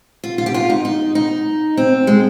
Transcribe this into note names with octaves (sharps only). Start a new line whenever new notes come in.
F4
F4
G4
F4
D#4
D#4
D#4
C4
G#3